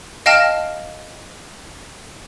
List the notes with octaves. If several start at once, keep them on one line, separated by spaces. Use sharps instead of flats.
D#5 F5 G5 A5 F6 A#6